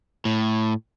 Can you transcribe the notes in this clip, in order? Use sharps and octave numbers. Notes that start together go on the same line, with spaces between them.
A2